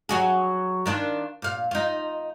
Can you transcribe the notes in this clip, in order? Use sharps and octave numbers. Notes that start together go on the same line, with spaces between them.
F#3 F#4 G#4
D#3 D4 F4
A#2 F5
D#4 F4